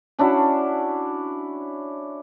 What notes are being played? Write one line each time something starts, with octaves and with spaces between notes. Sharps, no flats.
C#4 D4 E4 F#4